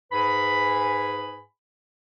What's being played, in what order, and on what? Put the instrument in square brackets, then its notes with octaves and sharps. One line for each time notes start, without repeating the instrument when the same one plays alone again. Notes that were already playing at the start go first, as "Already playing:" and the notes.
[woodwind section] G#2 G#4 B4 G#5 B5